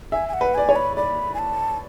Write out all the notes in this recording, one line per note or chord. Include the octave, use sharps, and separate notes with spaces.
E5 G#5
G#5
F#5
B4
D5 G#5
C#5
B5
D5 B5
G#5
A5